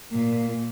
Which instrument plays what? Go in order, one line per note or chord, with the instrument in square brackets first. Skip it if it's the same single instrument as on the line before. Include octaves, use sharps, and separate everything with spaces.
[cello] A#2